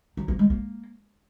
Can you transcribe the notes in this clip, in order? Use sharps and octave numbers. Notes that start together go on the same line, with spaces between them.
F#3
A#3
G#3
A#3